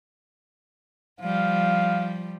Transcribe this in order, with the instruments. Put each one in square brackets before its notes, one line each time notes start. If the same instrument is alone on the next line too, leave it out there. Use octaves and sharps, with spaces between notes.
[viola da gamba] F3 G3 [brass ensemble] F5